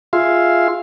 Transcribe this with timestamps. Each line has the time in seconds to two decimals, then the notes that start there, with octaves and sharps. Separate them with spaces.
0.13 F4 G#4 E5 F5 C6